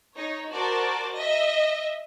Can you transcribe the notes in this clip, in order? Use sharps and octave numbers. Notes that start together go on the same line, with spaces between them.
D#4 C#5
F#4 A#4 C5 D5 A5
D#5 E5